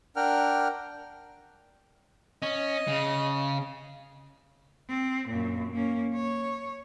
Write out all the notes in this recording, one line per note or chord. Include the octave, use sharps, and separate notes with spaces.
D4 A#4 F#5 G5 F6
C#4 D#5
C#3
C4
F#2 A#2
A#3 C#4
C#5